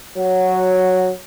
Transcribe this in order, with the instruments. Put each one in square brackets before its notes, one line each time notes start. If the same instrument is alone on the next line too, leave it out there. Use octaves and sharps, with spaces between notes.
[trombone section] F#3